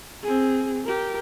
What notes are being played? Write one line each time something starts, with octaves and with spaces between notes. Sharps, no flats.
C4 G#4
G4 A#4